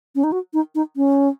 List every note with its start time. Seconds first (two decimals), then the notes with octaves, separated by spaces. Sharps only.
0.15 C#4
0.24 D#4
0.32 F#4
0.53 D#4
0.75 D#4
0.96 C#4